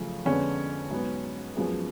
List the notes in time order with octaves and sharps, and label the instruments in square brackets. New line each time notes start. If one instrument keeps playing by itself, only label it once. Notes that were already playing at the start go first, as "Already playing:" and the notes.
Already playing: [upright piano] F#2 C#3 F3 A3
F2 D3 G#3 B3 C#4
G#2 F#3 B3
F#2 F3 G#3 B3